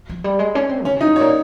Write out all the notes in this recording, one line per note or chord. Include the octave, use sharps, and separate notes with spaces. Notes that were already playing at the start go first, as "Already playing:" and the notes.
F3
G3
G#3
C#4
C4
C#3 C#4
C3 D#4
G#2
A#2 C#5